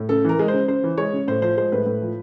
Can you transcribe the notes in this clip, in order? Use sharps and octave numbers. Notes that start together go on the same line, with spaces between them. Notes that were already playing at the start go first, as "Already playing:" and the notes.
Already playing: A2
C#3 A4
E3 A#4
G#3
C5
C#3
C#3 C5
E3
G#3 C#5
C#3
A2 C5
F3 C5
G#3 C5
A2 B4
A2
F3